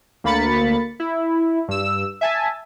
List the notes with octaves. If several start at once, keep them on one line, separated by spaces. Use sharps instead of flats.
D2 A#3 B5 A6 C#7
E4
G2 E6
E5 G#5 A5